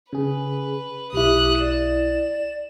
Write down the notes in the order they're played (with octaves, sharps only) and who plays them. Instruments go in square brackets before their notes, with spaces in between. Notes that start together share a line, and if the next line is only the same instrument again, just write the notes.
[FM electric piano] C#3 G#4 [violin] B4
[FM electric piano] B1 E4 [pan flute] G4 [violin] D#6 F#6
[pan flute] D5 [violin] E7